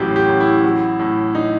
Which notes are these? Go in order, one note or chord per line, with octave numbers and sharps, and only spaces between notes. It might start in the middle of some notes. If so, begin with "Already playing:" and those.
Already playing: A1 A2 F#3 F#4 G4
G4
A1
E4
F#3
A2
D#4